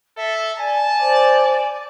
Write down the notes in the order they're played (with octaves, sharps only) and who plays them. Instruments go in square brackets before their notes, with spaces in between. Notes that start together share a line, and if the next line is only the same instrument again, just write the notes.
[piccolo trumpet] A4 [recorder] E5
[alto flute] D5 [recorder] G#5 [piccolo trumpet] A5
[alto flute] C5 [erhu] D5